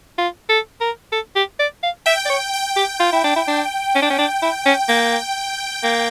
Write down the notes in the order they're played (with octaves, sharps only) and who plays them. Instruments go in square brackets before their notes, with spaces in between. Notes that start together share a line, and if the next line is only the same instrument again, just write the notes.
[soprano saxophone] F4
A4
A#4
A4
G4
D5
F5
[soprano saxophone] E5 [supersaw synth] G5
[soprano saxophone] D5
C#5
[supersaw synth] G5
[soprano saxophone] G4
F4
E4
D4
E4
D4
C#4
D4
C#4
D4
E4
C#4
[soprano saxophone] A#3 [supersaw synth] G5
[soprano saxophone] A#3